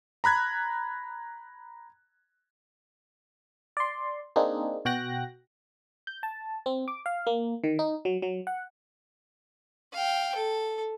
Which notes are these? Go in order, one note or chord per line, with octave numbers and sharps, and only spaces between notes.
A#5 B5 F#6 G#6
D5 C6
A#3 C4 D4 D#4 G#4
B2 F#4 G5 F#6 A#6
G6
A5
C4
D6
F5
A#3
D#3
D#4
F#3
F#3
F#5
F5 G5
A4